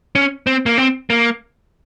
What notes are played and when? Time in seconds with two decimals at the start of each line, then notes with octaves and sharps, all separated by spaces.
0.15 C#4
0.47 C4
0.66 A#3
0.78 C4
1.10 A#3